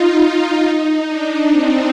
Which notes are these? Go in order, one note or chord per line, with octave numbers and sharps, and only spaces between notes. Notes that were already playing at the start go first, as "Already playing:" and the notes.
Already playing: D#4 F4
D#4
D4
C4